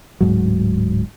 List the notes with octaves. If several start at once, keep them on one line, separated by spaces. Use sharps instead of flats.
D1 G#2 F#3